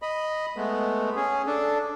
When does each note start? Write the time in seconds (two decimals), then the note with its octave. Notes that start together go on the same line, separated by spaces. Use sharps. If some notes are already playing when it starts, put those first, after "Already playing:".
0.02 D#5 B5
0.57 G#3 A3 B3
1.16 C#4 G#4
1.47 D4 A4